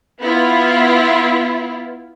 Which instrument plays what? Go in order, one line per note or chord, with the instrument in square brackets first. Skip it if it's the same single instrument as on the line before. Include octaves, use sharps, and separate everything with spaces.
[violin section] B3 E4 F4